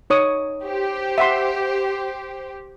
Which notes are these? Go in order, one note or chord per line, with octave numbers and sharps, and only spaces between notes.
D#4 C#5 D#6
G4 C5
E5 F#5 C6